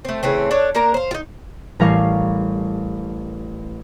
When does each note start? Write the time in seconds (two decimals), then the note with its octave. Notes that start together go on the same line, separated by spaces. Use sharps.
0.05 A3 C4
0.23 C#3 E3 A3 C4
0.51 D4 A4 C#5
0.75 A#3 D4 A#4 A#5
0.94 C5 F5
1.11 D#4 F4
1.80 A1 G3 A#4 F5 C#6 C7